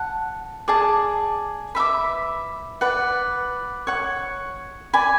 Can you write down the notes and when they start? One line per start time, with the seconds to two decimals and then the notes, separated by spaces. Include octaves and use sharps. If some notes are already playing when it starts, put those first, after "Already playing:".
Already playing: F#5 A5
0.68 G#4 D5 A5
1.75 B4 E5 B5 D6
2.81 B4 D5 F#5
3.87 C#5 F#5 C#6
4.93 D5 G#5 B5